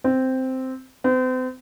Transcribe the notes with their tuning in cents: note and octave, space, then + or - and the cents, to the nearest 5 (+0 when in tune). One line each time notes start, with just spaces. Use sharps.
C4 -5
C4 -40